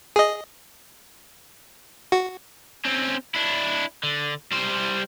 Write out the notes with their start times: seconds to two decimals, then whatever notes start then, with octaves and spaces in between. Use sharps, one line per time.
0.16 G#4 D#5
2.12 F#4
2.85 C4 C#4
3.35 D4 E4
4.04 D3
4.52 G3 C5